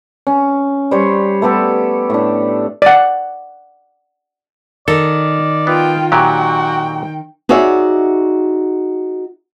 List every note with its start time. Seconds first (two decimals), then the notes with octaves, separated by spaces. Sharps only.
0.27 C#4
0.91 G3 C5 C#5
1.42 A3 B3 G4 A4
2.10 A2 D4
2.82 D5 F#5
4.88 D#3 A4 D5
5.67 B3 F4 G5
6.12 A#2 F#3 F#4 G4 G5
7.49 D#4 F#4 G#4 C#5 D5 E5